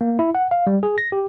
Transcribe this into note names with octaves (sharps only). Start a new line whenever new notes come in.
A#3
E4
F#5
F5
G3
G#4
A#6
G4